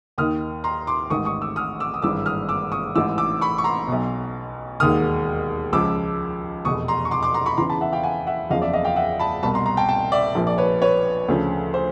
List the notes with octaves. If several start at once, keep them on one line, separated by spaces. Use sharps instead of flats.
D#2 D#3 D#6 F6
A#5 C6
C6 D6
A1 G#2 D#3 C#6 D#6
C#6 D#6
D6 E6
D#6 F6
D6 E6
D#6
G#1 G2 E3 D6 E6
D#6 F6
D6 E6
C#6 D#6
A1 G#2 E3 D6 E6
D6 E6
B5 C#6
C#6
A#5 C6
B1 B2
E1 D#2 D#3 D#6 F6
C#2 C#3 F3 D6 E6
F1 E2 B2 C#6 D#6
A#5 C6
C#6
C6 D6
C6 D6
A#5 C6
B5 C#6
E2 C#3 E3 A#5 C6
A5 B5
E5 F#5
F5 G5
F#5 G#5
E5 F#5
F#1 E2 C#3 F3 D#5 F5
D5 E5
D#5 F5
F5 G5
E5 F#5
A5 B5
C2 B2 A5 B5
A#5 C6
A#5 C6
G5 A5
G5 A5
D5 E5
A#1 A#2 F3
D5
B4 C#5
B4 C#5
D2 C#3 F3
C5